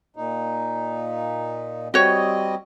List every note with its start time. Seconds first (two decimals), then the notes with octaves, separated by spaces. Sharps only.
0.16 A#2 D#4
1.94 G3 C4 F#4 C#5 D#5